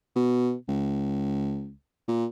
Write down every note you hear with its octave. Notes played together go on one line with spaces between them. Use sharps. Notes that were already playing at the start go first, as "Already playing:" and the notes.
B2
C#2
A#2